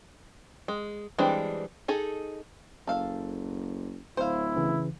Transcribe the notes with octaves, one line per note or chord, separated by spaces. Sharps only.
G#3
E3 G3 G#3 C4 D4
D#4 G#4 A4
F#1 A4 F5
D1 E4 C5 F5
C#3 E3